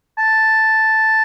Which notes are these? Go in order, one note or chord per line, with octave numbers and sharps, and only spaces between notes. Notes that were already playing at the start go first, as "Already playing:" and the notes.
A5